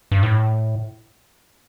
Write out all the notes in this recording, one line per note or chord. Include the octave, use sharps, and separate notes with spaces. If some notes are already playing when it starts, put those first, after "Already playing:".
G2
A2